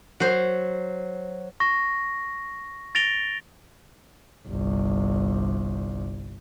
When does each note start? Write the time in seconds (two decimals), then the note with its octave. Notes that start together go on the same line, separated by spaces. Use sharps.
0.20 F#3 C5
1.60 C#6 A#6
2.95 A6 A#6 D7 F7 G7
4.48 G1 C2